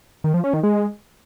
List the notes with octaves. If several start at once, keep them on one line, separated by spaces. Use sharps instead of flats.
D#3
F3
C#4
D#3
G#3